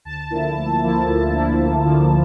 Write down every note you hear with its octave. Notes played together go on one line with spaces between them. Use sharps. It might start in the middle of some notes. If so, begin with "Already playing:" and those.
D2 A5
D3 F3 A#3 E4
D2
D3 F3 A#3 E4
D2
D3 F3 A#3 E4
D2
D3 F3 A#3 E4